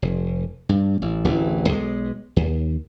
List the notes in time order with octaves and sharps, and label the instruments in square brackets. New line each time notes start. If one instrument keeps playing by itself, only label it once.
[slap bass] F1
G2
A1
D1 A1 E3
B1 G#3
D#2